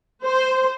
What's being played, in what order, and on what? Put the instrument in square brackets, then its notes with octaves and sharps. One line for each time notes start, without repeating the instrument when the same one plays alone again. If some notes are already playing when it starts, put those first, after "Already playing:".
[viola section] C5